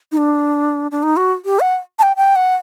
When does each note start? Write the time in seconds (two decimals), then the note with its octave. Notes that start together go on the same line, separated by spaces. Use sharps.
0.12 D#4
0.17 D4
0.91 D4
1.03 D#4
1.17 F#4
1.45 G4
1.60 F#5
1.99 A5
2.03 G5
2.17 G5
2.36 F#5